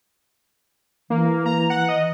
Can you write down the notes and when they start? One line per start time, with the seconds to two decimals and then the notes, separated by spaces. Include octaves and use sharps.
1.10 E3 A#3
1.46 A#5
1.70 F#5
1.89 D#5